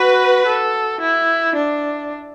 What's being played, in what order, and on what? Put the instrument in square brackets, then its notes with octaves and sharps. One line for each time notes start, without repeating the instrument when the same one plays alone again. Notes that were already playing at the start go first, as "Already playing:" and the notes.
Already playing: [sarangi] F#4 [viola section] B4
[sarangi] A4
E4
D4